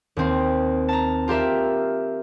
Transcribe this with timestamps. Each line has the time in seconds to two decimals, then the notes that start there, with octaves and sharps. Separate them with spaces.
0.17 D#2 C4
0.89 A5 A#5
1.28 F4 G4 A#4 E5